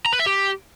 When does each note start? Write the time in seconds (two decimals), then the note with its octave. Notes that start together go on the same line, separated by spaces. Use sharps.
0.06 A#5
0.13 B4
0.19 E5
0.26 G4